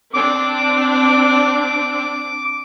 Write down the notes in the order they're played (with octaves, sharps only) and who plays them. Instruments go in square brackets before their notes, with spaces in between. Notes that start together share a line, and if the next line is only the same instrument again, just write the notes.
[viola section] C4 D4 [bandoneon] D6